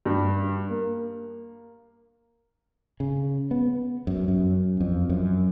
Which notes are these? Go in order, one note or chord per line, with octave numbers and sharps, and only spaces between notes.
G2
A#3
C#3
B3
F#2
F#2
F2
F#2